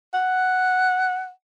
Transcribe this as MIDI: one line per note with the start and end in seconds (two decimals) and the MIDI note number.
0.14 1.30 78